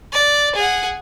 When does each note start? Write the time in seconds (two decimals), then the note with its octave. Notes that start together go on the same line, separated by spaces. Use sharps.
0.12 D5
0.55 G#4 F#5